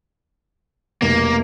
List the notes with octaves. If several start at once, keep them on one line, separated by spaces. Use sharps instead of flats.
F1 B1 A#3